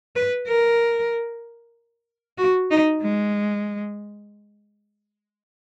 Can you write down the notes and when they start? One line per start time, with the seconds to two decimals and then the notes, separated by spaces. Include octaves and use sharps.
0.16 B4
0.48 A#4
2.38 F#4
2.71 D#4
3.02 G#3